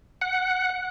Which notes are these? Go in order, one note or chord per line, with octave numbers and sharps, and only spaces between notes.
F#5